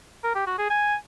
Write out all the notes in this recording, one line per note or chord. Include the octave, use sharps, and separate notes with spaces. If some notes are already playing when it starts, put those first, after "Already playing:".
A#4
G4
F#4
G#4
G#5